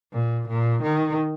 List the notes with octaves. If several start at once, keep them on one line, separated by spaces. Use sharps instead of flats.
A#2
A#2
D#3